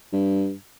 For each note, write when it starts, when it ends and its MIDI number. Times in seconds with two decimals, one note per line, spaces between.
0.13 0.54 43